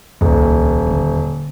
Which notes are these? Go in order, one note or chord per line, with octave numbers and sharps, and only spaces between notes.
D#1 C#2
D3 C#4